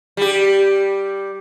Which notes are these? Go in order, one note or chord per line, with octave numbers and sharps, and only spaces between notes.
G3 G4